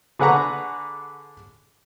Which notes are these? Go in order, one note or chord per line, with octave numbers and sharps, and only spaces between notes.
D3 G#4 B4 F#5 A#5 C#6